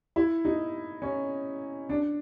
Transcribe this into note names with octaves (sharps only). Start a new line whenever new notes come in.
E4
D#4
C#4
D4